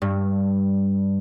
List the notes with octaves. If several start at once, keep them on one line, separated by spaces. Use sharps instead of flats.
G2